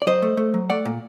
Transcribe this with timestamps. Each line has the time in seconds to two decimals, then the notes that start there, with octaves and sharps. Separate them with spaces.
0.02 D5
0.07 F#3 C5 D#5
0.22 A3
0.37 A3
0.54 F#3
0.70 A3 D5 F#5
0.85 A#2